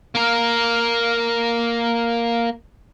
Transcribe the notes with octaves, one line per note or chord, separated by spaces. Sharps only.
A#3 A#4